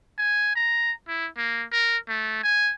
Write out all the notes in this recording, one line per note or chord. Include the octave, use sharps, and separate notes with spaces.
G#5
A#5
E4
A#3
A#4
A3
G#5